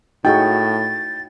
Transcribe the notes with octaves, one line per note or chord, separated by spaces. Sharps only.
A2 D#4 F#4 G#4 G5 A6